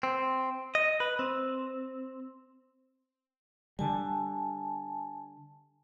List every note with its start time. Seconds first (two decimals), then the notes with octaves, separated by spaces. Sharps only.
0.03 C4
0.75 D#5
1.00 B4
1.19 C4
3.79 D3 G3 G#5 A5